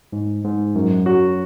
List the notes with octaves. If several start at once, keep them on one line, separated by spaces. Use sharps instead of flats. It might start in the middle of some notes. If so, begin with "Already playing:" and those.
G#2
G#2
F#2
F#3 F#4